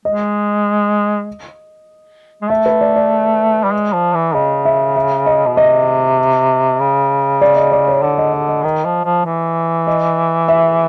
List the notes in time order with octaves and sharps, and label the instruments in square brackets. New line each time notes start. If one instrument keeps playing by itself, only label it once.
[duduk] G#3 [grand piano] D#5
[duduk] G#3
[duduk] A3 [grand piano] E5
[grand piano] B4
D5
D5
[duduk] G3
G#3
F3
E3
[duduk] C#3 [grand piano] D#5
[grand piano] E5
E5
D#5
[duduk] B2
[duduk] C3 [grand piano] D#5
[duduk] C#3
[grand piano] D5
D#5
D5
C#5
[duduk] D3 [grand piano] D5
[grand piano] D#5
D#5
D#5
[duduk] D#3 [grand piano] D#5
[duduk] F3
F3
E3
[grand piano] D#5
E5